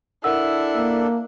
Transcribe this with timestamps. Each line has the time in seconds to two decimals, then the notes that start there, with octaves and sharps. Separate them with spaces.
0.24 D4 E4 A4 A#4 F#5 E6
0.76 A#3